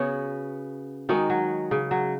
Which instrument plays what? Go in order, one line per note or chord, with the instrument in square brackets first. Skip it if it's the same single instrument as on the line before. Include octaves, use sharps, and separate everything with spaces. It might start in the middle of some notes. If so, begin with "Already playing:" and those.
Already playing: [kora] C#3 [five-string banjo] B3 F#4 C#5
[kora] D#3 [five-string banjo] G#3 D#4 F#4
[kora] F#3
C#3
F#3